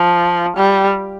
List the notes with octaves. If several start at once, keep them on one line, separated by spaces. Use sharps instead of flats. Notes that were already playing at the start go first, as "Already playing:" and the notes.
Already playing: F3
G3